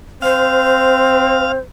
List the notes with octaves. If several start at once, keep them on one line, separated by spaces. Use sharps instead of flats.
C4 C5 F5